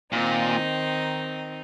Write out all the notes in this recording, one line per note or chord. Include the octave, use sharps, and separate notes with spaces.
A#2 D#3 C4 D#4